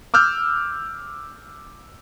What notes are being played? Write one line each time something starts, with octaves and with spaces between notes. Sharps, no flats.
D6 E6 F6 G6